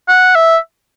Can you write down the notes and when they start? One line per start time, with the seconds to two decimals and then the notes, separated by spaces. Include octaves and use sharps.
0.09 F#5
0.35 E5